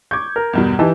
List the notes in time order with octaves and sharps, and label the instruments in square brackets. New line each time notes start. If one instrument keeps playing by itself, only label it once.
[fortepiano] C#6 D6 [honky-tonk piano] G6 G#6
[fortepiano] A#4
[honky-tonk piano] E2 G2 B2
[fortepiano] E3 [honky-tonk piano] D#4 G4 A5